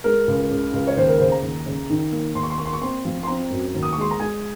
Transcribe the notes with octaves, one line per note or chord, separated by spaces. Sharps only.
G#3 A#4
C#2
C#3
C#2
C#5
D#2 C5
A#4
C#3 C5
A#5
D#2
C#3
D#3
A#3
D#2 C6
C#6
C6
A#3 C#6
C6
C#6
C4 C6
F3
C6
C4 A#5
F#2
D#2
D#6
C#6
G#3 C6
A#5
G#3 G#5